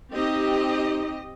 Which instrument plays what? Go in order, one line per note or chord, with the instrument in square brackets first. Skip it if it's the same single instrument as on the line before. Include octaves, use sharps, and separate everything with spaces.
[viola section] C4 G4 D#5 [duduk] D#4